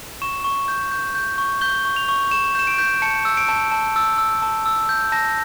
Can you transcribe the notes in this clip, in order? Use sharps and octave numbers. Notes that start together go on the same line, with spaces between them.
C#6 E7
C#6
G6
G6
G6
C#6
G6 G7
C#6
F7
C#6
C#6 E7
G6 E7
D7
G6
A5 C#7
E6
D7
A5
A5
E6
E6
A5
E6
G6
A5 A#6